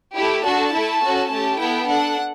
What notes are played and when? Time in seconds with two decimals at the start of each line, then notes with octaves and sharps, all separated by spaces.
0.15 A3 E4 G4
0.44 D4 F#4 A4 A5
0.74 A3 E4 A4
1.03 C#4 F#4 A4
1.30 A3 C#4 G4 A5
1.59 B3 E4 A4 G5
1.88 D4 A4 F#5